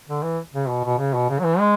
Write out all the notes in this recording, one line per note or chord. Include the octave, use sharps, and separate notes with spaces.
D3
E3
C#3
B2
B2
C#3
B2
C#3
F#3
E3
G#3